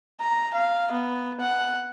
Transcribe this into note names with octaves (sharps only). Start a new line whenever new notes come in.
A#5
F5
B3
F#5